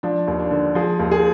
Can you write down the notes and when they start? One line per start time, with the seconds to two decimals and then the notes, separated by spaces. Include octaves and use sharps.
0.03 F3 D4
0.27 D#2
0.39 D4
0.51 D3
0.75 F3 G#4
0.99 D#2
1.11 G#4